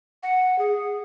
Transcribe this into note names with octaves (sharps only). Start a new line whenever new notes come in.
F#5
G#4